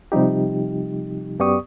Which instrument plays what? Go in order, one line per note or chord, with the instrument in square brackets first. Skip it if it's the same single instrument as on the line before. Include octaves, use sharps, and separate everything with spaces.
[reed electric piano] C3 F3 G3 D#4 G4
F#2 B3 G4 D5 C#6 D#6